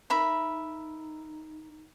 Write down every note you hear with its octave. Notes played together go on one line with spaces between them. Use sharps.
D#4 A#4 E5 B5